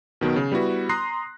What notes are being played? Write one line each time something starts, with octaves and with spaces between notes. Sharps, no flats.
B2 D#3 F#3 B3
C#3
G3 B3 E4 F#4 B4
A#5 C6 D#6 F#6 A#6 C7